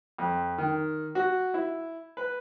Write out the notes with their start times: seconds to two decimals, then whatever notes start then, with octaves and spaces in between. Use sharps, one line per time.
0.18 F2
0.58 D#3
1.15 F#4
1.54 E4
2.17 B4